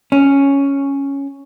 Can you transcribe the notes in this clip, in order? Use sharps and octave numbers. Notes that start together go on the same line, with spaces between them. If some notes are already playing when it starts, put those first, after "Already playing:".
C#4